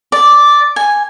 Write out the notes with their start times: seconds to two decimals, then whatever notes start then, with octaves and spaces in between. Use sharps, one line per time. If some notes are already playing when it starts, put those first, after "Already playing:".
0.12 D5
0.76 G#5